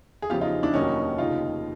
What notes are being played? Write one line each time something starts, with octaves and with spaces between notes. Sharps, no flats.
G#4
E2 C#3 F3 F4 G4
D#4 F4
D4 E4
F1 D#2 D#3 F#3 C#4 D#4
F1 D#2 C#3 D#4 F4